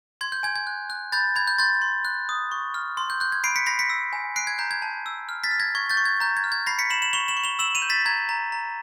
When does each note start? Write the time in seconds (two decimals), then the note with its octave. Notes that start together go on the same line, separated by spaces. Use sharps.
0.21 C6 G#6
0.32 G6
0.43 G#5 G#6
0.56 G#6
0.67 F#6
0.90 F#6
1.12 B5 G6 A6
1.36 B5 G#6
1.47 G6
1.58 C6 G6 A6
1.82 C6
2.05 F#6
2.29 D#6
2.52 C#6
2.74 F6
2.97 C6
3.10 G6
3.20 F#6 G6
3.32 G#6
3.44 B5 C7 D7
3.56 B6 C#7
3.66 B5 A#6 C7
3.79 B6 C#7
3.90 E6
4.13 G#5
4.36 F#6 C7 D7
4.47 G#6
4.59 A#5 G6
4.71 G#6
4.82 A5
5.06 E6
5.29 F6
5.44 A6 B6
5.51 F6
5.60 G#6 A#6
5.75 C#6 G#6
5.90 G6 A6
5.97 C#6
6.05 G#6
6.20 A#5 G6
6.37 G#6
6.44 F6
6.52 G#6
6.66 B5 A#6 C7
6.79 B6 C#7
6.90 B5 E7 F#7
7.02 E7 F#7
7.13 C#6 F7 G7
7.28 E7 F#7
7.37 C#6
7.44 F7 G7
7.59 E6 E7 F#7
7.75 D#7 F7
7.82 G6
7.90 A6 B6
8.05 A#5 G#6
8.29 A#5
8.52 A#5